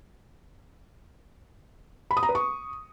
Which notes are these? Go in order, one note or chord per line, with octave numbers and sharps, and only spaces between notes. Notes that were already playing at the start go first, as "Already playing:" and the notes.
B5
D#6
A#5
B4
C#6